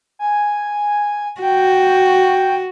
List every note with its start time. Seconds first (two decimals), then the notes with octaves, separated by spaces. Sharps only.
0.19 G#5
1.42 F#4 G5